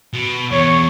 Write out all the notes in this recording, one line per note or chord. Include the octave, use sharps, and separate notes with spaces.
B2
E2 C#5